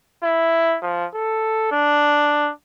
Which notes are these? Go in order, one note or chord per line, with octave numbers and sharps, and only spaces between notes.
E4
F3
A4
D4